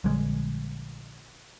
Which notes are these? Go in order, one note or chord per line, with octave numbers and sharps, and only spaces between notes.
A#1 D3 G3 G#3